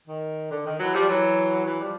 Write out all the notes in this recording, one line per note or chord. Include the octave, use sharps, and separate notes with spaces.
D#3
D3
D#3
E3 F#3
F3 G3
E3 F#3
E3 F#3
F3 G3